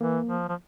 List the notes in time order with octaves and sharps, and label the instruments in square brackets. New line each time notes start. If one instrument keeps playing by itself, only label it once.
[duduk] E3 [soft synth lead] A#3
[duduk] F3
F3